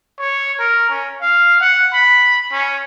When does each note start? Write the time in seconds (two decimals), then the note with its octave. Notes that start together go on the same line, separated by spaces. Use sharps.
0.19 C#5
0.59 A#4
0.90 C#4
1.21 F5
1.61 F#5
1.93 B5
2.52 C#4